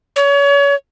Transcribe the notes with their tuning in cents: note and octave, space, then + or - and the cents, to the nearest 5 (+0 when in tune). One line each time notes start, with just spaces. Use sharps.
C#5 +30